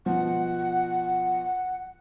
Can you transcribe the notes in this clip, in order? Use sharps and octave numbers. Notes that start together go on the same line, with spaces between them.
B2 F3 F#5